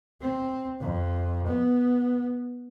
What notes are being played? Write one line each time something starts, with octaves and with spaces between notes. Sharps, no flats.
C4
F2
B3